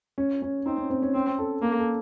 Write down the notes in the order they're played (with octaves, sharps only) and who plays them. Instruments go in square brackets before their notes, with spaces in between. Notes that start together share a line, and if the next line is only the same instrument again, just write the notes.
[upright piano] C#4
C#4
[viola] C4 [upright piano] D#4
[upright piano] C#4
C4
C#4
[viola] C4 [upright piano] C#4
[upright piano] A4
[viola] A#3 [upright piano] A#4
[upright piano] A4